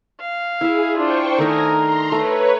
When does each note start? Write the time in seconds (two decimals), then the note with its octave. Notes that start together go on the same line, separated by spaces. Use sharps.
0.20 F5
0.61 E4 G#4 E5
0.96 D4 F4 C5 G5 C#6
1.38 D#3 A3 D#4 A#4 G#5 A#6
1.74 A#5 C6
2.12 A3 B4 C#5 A#5